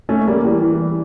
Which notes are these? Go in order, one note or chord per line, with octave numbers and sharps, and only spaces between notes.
A3 C#4
G3 A#3
E3 G3
E3